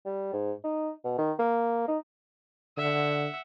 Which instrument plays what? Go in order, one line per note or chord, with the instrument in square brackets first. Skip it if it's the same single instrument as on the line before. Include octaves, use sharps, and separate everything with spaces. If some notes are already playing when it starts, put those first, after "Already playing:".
[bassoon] G3
G#2
D#4
B2
D#3
A#3
D#4
[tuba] D3 [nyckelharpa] E5 F#5